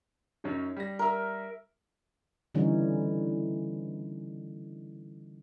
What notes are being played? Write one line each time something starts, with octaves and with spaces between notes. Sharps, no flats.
F#2 C#4 D#4
G3 A#6
A#4 E5
D3 E3 G3 C#4 D#4